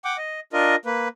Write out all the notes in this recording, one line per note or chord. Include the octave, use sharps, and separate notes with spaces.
F#5 G5 D6
D#5
D4 F4 A#4 D#5
A#3 B4